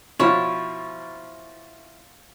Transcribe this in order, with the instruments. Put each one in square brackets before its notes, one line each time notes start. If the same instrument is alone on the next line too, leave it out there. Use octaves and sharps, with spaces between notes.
[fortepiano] B2 F3 F4 [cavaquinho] E4 C#5